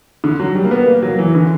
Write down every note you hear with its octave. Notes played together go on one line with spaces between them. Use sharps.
D3
F#3
G3
A#3
B3
A#3
F#3
E3
D3